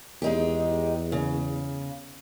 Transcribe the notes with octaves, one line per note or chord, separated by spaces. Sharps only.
E2 G#3 D#4 G4
C#3